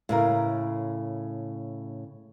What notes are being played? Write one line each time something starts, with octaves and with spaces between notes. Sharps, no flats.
A2 C#3 A#4